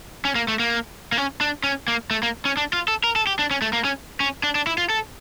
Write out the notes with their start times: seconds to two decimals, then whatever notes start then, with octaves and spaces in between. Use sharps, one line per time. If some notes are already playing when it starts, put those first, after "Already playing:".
0.25 C#4
0.35 A#3
0.48 A3
0.60 A#3
1.12 A#3
1.18 C#4
1.41 D4
1.64 C#4
1.88 A#3
2.11 A3
2.23 A#3
2.45 C#4
2.57 D4
2.73 F4
2.88 A4
3.04 A#4
3.16 A4
3.27 G4
3.39 D4
3.51 C#4
3.62 A3
3.73 A#3
3.85 C#4
4.20 C#4
4.43 D4
4.55 D4
4.67 E4
4.78 F4
4.90 A4